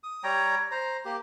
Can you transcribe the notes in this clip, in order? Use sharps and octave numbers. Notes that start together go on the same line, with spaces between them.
D#6
G3 C#5 G5 A#5
C5 A#5
A#3 G4